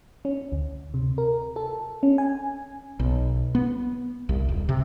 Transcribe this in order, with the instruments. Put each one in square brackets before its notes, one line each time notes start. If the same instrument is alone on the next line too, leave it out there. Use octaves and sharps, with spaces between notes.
[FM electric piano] C#4
D2
C3
A#4
A4
C#4
G#5
[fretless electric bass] B1
B3
C2
D#1
C3